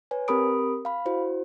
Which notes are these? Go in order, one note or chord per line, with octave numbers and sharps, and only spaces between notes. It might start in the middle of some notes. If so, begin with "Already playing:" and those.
B4 C#5 G#5
C4 G4 A#4 B5 D#6 D7
F5 B5
E4 F#4 C5